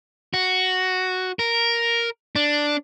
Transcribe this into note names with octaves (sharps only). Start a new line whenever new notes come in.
F#4
A#4
D4